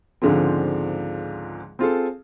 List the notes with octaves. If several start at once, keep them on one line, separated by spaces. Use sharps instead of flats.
C#2 G#2 D3 F3 C4
C4 F4 G#4 A4